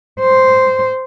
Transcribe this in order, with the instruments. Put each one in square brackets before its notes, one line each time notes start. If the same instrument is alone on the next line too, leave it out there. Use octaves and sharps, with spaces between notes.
[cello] C5